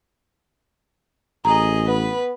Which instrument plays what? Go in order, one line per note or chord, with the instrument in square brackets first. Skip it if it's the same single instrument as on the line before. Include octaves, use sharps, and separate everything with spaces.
[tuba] A1 [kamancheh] G#4 D#5 [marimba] A#5
[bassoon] B3 [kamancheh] B4